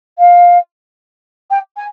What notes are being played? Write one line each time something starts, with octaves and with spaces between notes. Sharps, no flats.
F5
G5
G#5